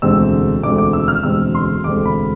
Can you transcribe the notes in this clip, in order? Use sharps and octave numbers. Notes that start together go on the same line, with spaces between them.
E1 D2 D3 G#3 C4 E6
E1 D2 D3 G#3 C4 D6
D6
E6
F6
E1 D2 D3 G#3 C4 E6
C6
E1 D2 D3 G#3 C4 D6
B5